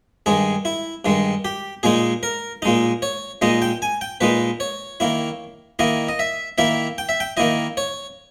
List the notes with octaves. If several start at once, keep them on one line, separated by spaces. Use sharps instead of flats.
G2 D#3 G#3 G#4
E4
G2 D#3 G#3
G4
A#2 G#3 D#4 G#4
A#4
A#2 G#3 D#4
C#5
A#2 G#3 D#4 D#5
G5
G#5
G5
A#2 G#3 D#4 B4
C#5
D#3 A#3 E4
D#3 A#3 E4 D#5
D#5
E5
D#3 A#3 E4 E5
G5
E5
G5
D#3 A#3 E4 D#5
C#5